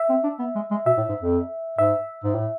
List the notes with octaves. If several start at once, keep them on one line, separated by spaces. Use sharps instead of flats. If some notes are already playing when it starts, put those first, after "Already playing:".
Already playing: E5
C4
D4
B3
G#3
G#3
B2 E5
A2
G#2
F2
G#2 E5
G#2
A2